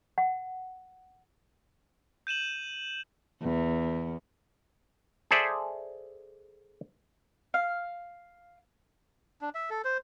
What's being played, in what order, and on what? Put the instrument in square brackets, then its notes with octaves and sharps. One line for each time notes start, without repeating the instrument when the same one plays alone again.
[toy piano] F#5
[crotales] G6 D#7 E7 F#7
[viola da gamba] E2
[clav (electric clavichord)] G#4 A4 C5 D5 E5
[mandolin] F5
[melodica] D4
E5
A4
C5